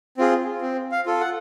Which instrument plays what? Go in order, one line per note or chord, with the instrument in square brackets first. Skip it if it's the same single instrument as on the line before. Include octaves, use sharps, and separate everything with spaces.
[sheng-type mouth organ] C4 F4 G#4
C4
F5
F4 A4
F#5